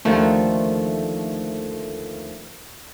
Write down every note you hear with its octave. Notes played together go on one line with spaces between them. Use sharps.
D#2 D3 D#3 F3 A3